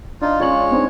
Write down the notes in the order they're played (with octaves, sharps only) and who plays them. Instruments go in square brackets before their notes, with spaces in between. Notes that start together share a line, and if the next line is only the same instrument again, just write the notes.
[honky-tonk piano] D4 [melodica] D#4 F4
[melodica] G#3 C#5 [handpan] C#4 F4 [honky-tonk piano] G#4 D5 F#7
[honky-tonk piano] C4 D4 D#4